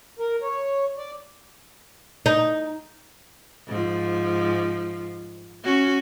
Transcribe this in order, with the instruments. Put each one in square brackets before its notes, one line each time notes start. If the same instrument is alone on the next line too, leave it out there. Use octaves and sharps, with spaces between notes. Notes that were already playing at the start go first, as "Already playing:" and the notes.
[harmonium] A#4
C#5
D5
[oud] D#4
[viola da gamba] G#2 F3
C#4 F#4